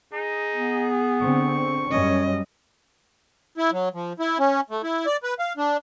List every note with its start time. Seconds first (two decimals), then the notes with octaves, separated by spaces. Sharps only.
0.13 D#4 G#4
0.55 B3
1.22 D3 C4 C#6
1.91 F#2 G3 C#4 C#5 D#5
3.58 E4
3.72 F#3
3.94 F3
4.20 E4
4.39 C#4
4.70 A3
4.83 E4
5.06 D5
5.23 B4
5.39 F5
5.57 D4